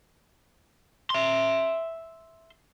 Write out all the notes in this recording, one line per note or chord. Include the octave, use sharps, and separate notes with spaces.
E5 C6